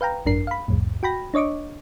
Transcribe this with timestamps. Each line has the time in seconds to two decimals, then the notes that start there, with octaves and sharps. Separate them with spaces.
0.01 B4 F5 G5 A#5
0.26 G#1 F#2 D4 A#4 C7
0.47 F5 B5
0.68 C2 F2 A2
1.03 F#4 G5 B5 A#6
1.34 D4 C#5 D#5 C#6 D6